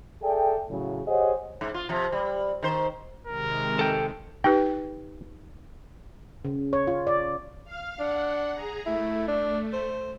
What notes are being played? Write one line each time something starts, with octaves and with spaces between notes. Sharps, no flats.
G#4 A4 D5 E5 G5
A2 C#3 F#3
G4 G#4 C5 C#5 D#5 F#5
G#2
F4
C3 F3
G3
D#3 C5
C3 D#3 G#3 A#4
A4 G5
D#4 G4 B4 G5
C#3
C#5
F4
D5
F5 F6
D4 F#5
G#4 A#5
A3 E4
D4
C5